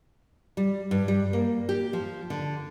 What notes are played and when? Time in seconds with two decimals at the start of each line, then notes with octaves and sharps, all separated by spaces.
0.57 G3
0.91 G2
1.08 G3
1.33 A#3
1.69 G4
1.93 F3
2.30 D3